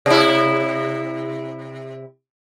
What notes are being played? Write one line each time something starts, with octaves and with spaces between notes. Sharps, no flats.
C3 E4